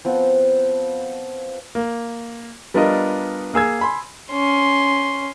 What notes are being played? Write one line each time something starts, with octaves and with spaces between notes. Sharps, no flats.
F3 B3 C4
A#3
G3 B3 D4 F4 A#4 D#5
A#3 G#4 E6 G#6
G#5 B5 C6
C#4 C6